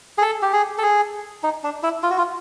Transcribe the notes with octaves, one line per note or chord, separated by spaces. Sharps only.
G#4
A4
G4
G#4
A4
G#4
D#4
D4
E4
F4
F#4
F4